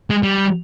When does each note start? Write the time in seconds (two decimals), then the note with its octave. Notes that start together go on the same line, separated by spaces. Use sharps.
0.10 G#3
0.23 G3